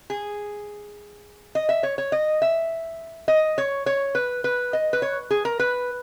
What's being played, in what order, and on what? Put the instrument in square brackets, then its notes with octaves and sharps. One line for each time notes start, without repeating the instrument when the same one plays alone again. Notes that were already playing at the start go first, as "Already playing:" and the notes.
[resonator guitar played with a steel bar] G#4
D#5
E5
C#5
C#5
D#5
E5
D#5
C#5
C#5
B4
B4
D#5
B4
C#5
G#4
A#4
B4